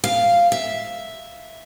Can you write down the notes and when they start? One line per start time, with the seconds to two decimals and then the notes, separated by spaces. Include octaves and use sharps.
0.04 F5
0.52 E5